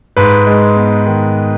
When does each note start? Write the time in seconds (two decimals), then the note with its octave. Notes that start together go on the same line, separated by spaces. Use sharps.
0.17 G#2 B4
0.47 G#3
0.76 B3
1.07 D#3